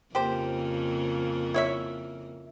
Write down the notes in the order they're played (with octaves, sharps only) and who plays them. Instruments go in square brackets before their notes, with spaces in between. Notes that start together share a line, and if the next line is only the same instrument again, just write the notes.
[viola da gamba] F2 C#3 A#3 [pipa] G4 C5
[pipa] E4 C#5 E5